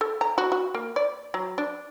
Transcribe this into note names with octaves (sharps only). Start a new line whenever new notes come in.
A4
A#5
F#4
F#4
A#3
D5
F#3
D4